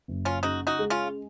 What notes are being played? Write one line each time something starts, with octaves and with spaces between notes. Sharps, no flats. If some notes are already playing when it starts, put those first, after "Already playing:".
F#1
C#4 F4
C#3 D#4 F#4
D#4 F#4
G#3
C#4 F4